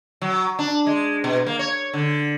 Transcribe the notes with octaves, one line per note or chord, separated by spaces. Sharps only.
F#3
D4
G#3
B2
A#3
C#5
D3